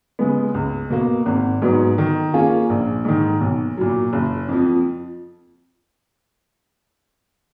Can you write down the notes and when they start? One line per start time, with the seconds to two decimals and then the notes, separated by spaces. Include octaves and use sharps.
0.19 C#3 G#3 B3
0.54 C#2
0.90 B2 A#3
1.26 G#1
1.62 G#2 F#3 B3
1.98 D#3
2.34 A#3 C#4 F4 G#4
2.70 A#1
3.05 G#2 D#3
3.41 B1
3.77 A#2 F#3
4.13 F#1
4.49 F2 F3